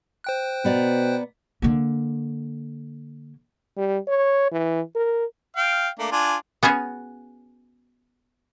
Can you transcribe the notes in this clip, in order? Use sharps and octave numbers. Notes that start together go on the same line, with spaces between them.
C5 G5 F#6
B2 B3 D5 A#5
D3 A#3
G3
C#5
E3
A#4
F5 G5
A3 A#3 D4
D4 F4 G#5
B3 C#4 F#4 G#4